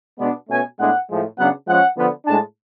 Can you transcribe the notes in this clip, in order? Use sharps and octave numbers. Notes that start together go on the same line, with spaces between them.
B2 G#3 B3 D4 D5
B2 A3 C#4 G#5
A2 G#3 B3 D4 F#5
A2 F3 G#3
C#3 F#3 B3 D4 F#5
F3 G#3 C#4 F#5
D3 F3 B3
A2 G#3 D4 A5